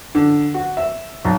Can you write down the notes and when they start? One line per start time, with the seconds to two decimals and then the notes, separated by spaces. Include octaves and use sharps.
0.15 D3
0.54 F#4
0.77 E5
1.25 B1